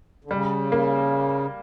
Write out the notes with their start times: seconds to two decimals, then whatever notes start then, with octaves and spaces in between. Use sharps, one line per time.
0.25 D3
0.31 C#3 G3
0.72 A#3